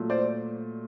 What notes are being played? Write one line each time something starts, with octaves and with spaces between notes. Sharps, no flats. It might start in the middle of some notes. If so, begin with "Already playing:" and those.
Already playing: A#2 F#3 A3
C5 D5